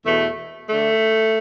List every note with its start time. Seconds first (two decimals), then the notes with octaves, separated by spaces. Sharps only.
0.05 E2 B2 A3
0.67 D3 A3